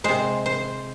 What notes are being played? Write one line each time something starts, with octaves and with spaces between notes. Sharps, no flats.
C3 G#3 C5
C5